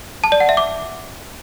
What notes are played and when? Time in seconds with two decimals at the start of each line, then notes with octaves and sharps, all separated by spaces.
0.24 A5
0.32 D5
0.40 F#5
0.49 E5
0.57 D6